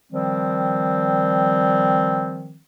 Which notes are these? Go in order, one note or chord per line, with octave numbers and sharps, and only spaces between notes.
D#3 F3 G3 C4